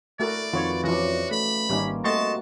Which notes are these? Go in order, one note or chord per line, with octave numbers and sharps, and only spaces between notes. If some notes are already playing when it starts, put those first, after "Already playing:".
A3 E4 F#4 A#4 D5
F2 D#3 F4 F#4 B4 C#5
C#3 E3 F3 F#4 D5
A3 B5
G#1 G3 A#3 C#4 D#4 C6
C3 A3 F#4 D#5 A5 C6 C#6